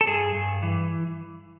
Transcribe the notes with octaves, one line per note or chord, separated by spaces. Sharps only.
A4
G2 G#4
G2
E3